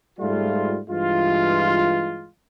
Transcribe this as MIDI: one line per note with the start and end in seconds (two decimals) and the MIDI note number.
0.19 0.79 44
0.19 0.79 55
0.19 0.79 57
0.19 0.79 65
0.89 2.28 43
0.89 2.28 52
0.89 2.28 56
0.89 2.28 65